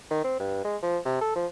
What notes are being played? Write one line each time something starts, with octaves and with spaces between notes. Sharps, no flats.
D#3
C4
G2
G#3
F3
C3
A4
F3